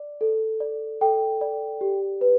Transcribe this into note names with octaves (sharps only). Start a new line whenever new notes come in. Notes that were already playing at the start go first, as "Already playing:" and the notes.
Already playing: D5
A4
D5
A4 G5
D5
G4
B4